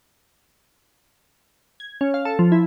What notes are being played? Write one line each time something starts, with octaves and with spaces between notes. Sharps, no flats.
G#6
C#4
F5
A4
F3
E4